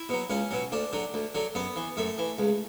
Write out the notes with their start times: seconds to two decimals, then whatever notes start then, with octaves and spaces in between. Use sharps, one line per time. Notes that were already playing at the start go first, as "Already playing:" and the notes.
Already playing: E4
0.09 B2 F#3
0.30 C#2 C#4
0.51 B2 F#3
0.72 D2 D4
0.93 D3 F#3
1.14 D2
1.35 D3 F#3
1.55 F#2 B3
1.76 E3
1.97 F#2 A3
2.18 E3
2.39 C#2